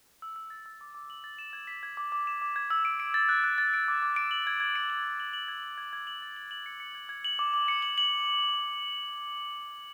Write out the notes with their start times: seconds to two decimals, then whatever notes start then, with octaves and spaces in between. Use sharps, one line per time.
0.22 E6
0.36 E6
0.50 A6
0.66 E6
0.81 D6
0.95 D6
1.10 F#7
1.24 A6
1.39 E7
1.53 G#6
1.67 B6
1.83 G#6
1.97 D6
2.12 D6
2.27 E7
2.42 D6
2.56 G#6
2.70 E6
2.85 D7
3.00 D7
3.14 A6
3.29 F#6
3.44 F#6
3.58 A6
3.74 D7
3.88 D6
4.02 D6
4.16 D7
4.31 F#7
4.47 G#6
4.60 G#6
4.76 D7
4.90 F#7
5.04 G#6
5.20 F#7
5.33 F#7
5.48 G#6
5.63 F#7
5.78 G#6
5.93 G#6
6.07 F#7
6.22 A6
6.37 F#7
6.51 F#7
6.66 C#7
6.80 C#7
6.95 G#6
7.09 G#6
7.24 F#7
7.39 D6
7.54 D6
7.68 C#7
7.82 F#7
7.98 F#7